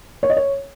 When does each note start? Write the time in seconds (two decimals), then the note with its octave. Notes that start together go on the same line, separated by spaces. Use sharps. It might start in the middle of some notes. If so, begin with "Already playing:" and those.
0.23 C#5
0.30 D#5
0.37 C#5